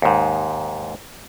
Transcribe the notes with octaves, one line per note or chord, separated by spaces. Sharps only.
D#2 G#2